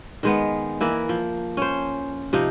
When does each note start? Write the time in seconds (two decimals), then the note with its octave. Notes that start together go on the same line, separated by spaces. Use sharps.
0.23 D#3 G#3 B3
0.80 E3 A#3 E4
1.09 F3
1.57 C#4 C5
2.33 C3 F3 D#4